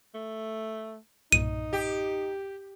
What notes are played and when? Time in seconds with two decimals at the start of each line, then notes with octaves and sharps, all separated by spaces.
0.15 A3
1.32 B1 G2 A#2 D#4 D#7
1.73 G4